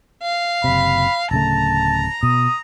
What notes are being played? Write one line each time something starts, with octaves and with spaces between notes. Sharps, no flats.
F5
F#1 C3 B5
D1 C#3 A3 A5 A#5
B2 D#6